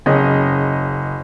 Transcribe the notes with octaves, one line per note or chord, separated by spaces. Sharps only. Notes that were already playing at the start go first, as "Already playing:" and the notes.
F#1 C#4 G#4 D#5